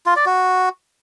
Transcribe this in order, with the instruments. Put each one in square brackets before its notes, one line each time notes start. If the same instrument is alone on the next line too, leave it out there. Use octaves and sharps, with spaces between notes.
[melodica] F4
D5
F#4